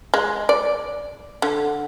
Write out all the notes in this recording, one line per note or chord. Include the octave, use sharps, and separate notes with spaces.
G#3
D5
D3